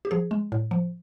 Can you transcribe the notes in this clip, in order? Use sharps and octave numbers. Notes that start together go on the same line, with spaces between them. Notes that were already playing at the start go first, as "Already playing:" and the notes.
G4
F3 G#4
G#3
A2
F3